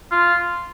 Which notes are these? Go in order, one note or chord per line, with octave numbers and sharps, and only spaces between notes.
F4